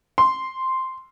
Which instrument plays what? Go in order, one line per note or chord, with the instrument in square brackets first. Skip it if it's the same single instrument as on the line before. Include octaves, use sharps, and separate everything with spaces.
[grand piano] C6